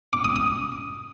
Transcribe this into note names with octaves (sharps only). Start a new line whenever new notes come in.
D6
D#6
D#6